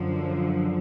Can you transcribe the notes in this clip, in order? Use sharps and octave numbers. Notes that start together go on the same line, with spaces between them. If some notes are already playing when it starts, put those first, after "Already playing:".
Already playing: F#2 D3 F3